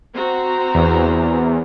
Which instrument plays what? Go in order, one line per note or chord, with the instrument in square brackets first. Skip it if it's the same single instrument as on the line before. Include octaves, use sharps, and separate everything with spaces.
[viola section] C4 F#4 A#5
[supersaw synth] E2